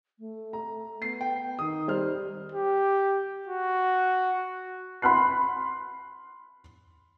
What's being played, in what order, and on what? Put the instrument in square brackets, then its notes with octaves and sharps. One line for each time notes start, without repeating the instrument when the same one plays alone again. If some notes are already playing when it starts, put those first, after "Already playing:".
[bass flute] A3
[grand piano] A#5
[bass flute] B3 [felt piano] C7
[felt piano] G5
[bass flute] D#3 [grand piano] D#6
[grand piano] G3 C5 F6
[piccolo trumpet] G4
F#4
[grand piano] B5 C6 F6 F#6 C7